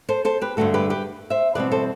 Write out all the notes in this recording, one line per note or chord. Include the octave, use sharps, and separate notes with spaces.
A4 C5
A4 C5
G4 B4
G2 D3 A3 F#4 A4
G4 B4
G4 B4
C5 E5
E2 B2 G3 C4 B4 D5
A4 C5